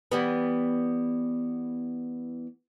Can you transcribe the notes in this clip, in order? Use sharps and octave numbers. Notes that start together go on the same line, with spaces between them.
E3 G3 B3